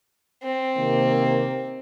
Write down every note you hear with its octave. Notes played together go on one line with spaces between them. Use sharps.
C4
C3 D#3 A#3